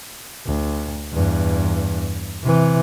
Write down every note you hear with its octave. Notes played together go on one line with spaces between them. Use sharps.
D2
E2 G2
C3 E3